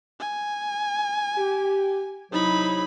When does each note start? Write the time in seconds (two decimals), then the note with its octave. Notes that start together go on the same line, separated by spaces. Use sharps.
0.19 G#5
1.37 G4
2.32 C3 F#3 D#4 E4 B5